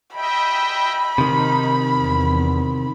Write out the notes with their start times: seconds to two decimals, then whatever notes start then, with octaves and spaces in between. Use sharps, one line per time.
0.15 D#5 E5 G5 B5
1.18 C3 D#3 D#4
1.95 E2